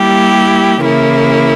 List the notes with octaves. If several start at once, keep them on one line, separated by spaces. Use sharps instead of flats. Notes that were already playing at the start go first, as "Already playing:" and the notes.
Already playing: G3 A#3 E4 G4
C#3 E3 A#3 E4